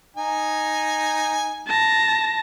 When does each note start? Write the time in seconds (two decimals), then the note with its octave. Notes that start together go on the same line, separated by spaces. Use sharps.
0.16 D#4 G#5
1.67 A5 A#6